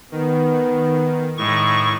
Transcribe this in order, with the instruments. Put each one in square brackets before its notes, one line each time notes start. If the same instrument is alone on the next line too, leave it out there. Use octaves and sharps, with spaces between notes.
[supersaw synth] D#3 [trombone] B3
[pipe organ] A2 C#6 [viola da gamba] D#3 G#3